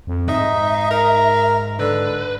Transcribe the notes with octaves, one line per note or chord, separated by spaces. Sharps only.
F2
G#2 D#4 E5
A#4
D3 B4